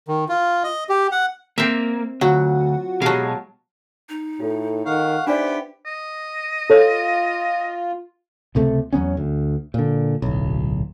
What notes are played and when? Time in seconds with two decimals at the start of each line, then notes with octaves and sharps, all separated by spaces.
0.08 D#3
0.29 F4
0.64 D#5
0.89 G4
1.12 F#5
1.58 A#3 C4 E5
2.21 D2 F#3 F4 F#4 F#5
3.02 B2 F#3 G#3 G4 F5 A5
4.09 D#4
4.40 A2 F4 A4
4.86 D#3 F5 F#5 C#6
5.27 B3 D4 D#4 G4 B4 C5 D5 E5
5.86 D#5
6.70 F4 A4 C#5
8.55 C#2 C3 A3
8.93 E2 F#3 B3 C#4
9.17 D2
9.74 A#2 D3
10.22 D1 B1